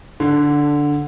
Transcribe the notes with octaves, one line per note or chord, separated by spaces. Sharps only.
D3